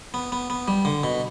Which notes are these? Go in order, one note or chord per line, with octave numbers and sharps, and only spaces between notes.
B3
B3
B3
G3
D3
B2